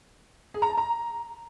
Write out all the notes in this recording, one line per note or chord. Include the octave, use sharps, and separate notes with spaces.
G#4
A#5
A5
A#5